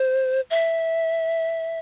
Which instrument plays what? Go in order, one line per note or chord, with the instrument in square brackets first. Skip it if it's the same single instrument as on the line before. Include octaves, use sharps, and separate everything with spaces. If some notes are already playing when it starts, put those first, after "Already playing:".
Already playing: [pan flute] C5
E5